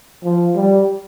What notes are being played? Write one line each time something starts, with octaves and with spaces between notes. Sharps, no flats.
F3
G3